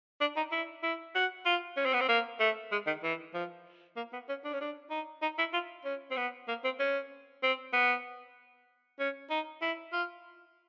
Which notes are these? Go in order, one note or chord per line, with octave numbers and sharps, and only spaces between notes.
D4
D#4
E4
E4
F#4
F4
C#4
C4
B3
C4
A#3
A3
G#3
D#3
E3
F3
A#3
B3
C#4
D4
C#4
D4
D#4
D#4
E4
F4
C#4
C4
B3
A#3
C4
C#4
C4
B3
C#4
D#4
E4
F4